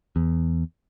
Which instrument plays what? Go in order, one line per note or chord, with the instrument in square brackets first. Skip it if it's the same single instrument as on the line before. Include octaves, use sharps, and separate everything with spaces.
[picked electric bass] E2